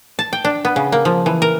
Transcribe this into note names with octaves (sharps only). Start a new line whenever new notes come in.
A5
G5
D4
B3
C#3
A#3
F3
E3
A#4